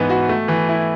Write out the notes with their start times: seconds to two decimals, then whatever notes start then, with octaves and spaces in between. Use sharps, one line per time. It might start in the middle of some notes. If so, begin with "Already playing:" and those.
Already playing: G#2 E3 B3
0.09 F#4
0.29 A3
0.48 E3
0.69 E4